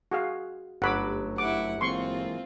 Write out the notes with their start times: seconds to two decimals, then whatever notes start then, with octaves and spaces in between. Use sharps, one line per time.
0.11 F#4 G#4 F5
0.82 G1 F#2 F#3 A3 F#5 B5 D6
1.38 E4 F#5 D6
1.81 E3 G#3 A#3 C4 F4 C6 C#6